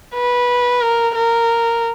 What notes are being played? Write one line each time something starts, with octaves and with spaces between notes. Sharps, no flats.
B4
A#4
A#4